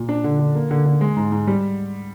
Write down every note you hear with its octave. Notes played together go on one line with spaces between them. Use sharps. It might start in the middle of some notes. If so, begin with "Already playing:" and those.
Already playing: A#2
D4
D3
D3
A#3
D3
D3
G#3
G#2
G#2
G3